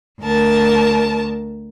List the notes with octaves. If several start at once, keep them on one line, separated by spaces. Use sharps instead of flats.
D2 A#4 A5